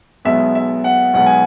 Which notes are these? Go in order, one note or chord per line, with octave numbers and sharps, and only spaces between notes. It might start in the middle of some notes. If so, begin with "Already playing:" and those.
B1 B2 G#3 B3 E5
E5
F#5
B1 B2 G#3 B3 F#5
G#5